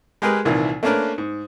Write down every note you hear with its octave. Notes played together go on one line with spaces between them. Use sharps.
G#3 G4 G#4 A#4 B4
C2 A#2 D#3 E3
A3 A#3 C#4 D4 A#4 B4
G#2